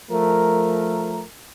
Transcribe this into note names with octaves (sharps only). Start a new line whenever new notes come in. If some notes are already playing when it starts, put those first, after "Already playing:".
F3 A3 A#4